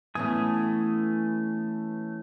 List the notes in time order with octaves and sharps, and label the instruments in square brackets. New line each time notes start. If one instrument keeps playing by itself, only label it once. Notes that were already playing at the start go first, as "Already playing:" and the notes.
[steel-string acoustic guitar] E3 B3 C#4 [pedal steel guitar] A3 G#5 D#6